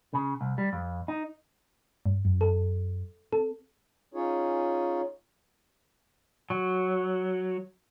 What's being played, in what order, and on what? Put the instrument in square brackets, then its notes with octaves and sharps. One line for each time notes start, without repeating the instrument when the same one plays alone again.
[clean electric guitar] C#3
C2
G3
F2
D#4
[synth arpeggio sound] G2
[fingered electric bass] F#2
[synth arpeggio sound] A4
[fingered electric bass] C4 [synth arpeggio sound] A4
[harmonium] C#4 D#4 F4 G#4 C#5
[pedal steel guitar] F#3